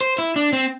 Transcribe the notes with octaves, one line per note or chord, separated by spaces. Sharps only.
C5
E4
D4
C4